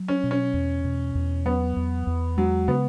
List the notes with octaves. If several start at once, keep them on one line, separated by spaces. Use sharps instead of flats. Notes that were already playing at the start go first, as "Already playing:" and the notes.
Already playing: F#3
C#4
B2
C#4
E2
B2
E2
F#3 B3
E2
E2
F#3 G#3
C#3 B3